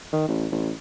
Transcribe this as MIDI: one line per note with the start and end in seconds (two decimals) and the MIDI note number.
0.13 0.24 51
0.28 0.46 33
0.51 0.71 33